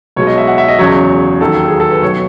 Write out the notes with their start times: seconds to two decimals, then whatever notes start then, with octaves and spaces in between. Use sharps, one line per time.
0.16 B1 B2 G#3 C#5
0.27 D#5
0.38 E5
0.47 F#5
0.58 E5
0.68 D#5
0.79 E2 C#3 F#3 C#5
1.41 D#2 D#3 F#3 A4
1.68 G#4
1.80 A4
1.91 B4
2.02 B1 B2 F#3 C#5